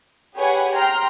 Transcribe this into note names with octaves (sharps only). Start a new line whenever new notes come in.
G4 G#4 B4 C#5 F#5 G#5
G5 A#5 C6 F6